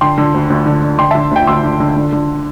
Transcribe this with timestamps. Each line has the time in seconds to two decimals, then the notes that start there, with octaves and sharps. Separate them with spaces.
0.01 D3 G5 C6
0.18 D3
0.34 D2
0.50 D2
0.66 D3
0.82 D3
0.98 D3 G5 C6
1.11 D3 E5 A5
1.31 D2 G5
1.47 D2 C6 E6
1.63 D3
1.80 D3
1.96 D3
2.12 D3